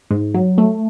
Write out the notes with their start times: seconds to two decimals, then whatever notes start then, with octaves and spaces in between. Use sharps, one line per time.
0.11 G#2
0.34 F#3
0.58 A3